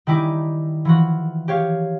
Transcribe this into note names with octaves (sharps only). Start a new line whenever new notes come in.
D#3 G3 D#4 E4 G#5 D6
E3 F3 F#4
G4 C#5 F5